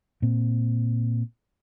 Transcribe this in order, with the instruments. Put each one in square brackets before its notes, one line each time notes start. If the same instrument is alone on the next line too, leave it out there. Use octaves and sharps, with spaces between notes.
[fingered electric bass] A#2 C4